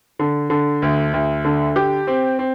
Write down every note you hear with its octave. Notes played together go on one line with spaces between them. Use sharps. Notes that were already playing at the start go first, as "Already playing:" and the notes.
D3
D3
D2
D2
D3
G4
C4
C4